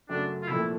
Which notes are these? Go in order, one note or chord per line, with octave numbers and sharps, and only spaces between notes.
F#2 C#3 F#3 A3 D4
F4
C2 A#2 F3 A3 E4